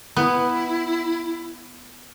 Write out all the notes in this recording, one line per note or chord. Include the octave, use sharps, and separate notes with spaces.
B3 E4